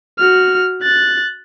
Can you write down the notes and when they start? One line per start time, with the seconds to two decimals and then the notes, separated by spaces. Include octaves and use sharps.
0.18 F#4 F6
0.83 F#6 A6